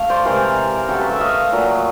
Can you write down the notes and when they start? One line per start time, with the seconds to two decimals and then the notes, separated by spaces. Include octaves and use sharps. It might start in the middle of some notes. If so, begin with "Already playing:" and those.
Already playing: A3 F5
0.10 C5 D5
0.25 C3 E3 G#3 A#4 C5
0.89 C#3 F#3 A3 G4 A4
0.99 A4 B4
1.10 D5 E5
1.20 D#5 F5
1.52 A#2 F#3 A3